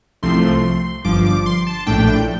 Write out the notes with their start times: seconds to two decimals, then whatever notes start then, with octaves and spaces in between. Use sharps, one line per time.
0.23 C2 C3 F3 A3 C4 C6
1.05 G1 G2 F3 D6
1.25 D6
1.46 C6
1.67 A5
1.87 A#1 A2 A3 D4 G5
2.07 G5